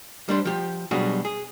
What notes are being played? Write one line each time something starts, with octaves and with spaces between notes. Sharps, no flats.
G3 D4 C5
F3 G4
B2 F#3 G3 D4 F#4 G#4
G#4